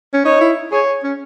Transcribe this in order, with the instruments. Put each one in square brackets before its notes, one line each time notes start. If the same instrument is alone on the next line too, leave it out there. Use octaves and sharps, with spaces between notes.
[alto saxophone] C#4
[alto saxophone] D#4 [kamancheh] C#5
[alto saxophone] E4
[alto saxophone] G#4 [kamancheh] C#5
[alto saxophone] C#4